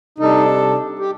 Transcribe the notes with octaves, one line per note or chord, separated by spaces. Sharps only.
C3 G3 D4 D#4 A4
G4